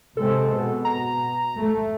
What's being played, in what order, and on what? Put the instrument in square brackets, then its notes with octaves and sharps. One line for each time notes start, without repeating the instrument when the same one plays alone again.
[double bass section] C3 G#3 C4 [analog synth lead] A4
[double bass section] B2
[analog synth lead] A#5
[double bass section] A3